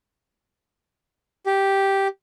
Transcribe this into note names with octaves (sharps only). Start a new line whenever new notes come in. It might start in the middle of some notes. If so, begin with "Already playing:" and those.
G4